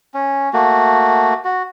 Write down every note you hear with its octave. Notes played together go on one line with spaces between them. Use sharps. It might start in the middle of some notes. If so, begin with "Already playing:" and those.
C#4
A3 A#3 F#4
F#4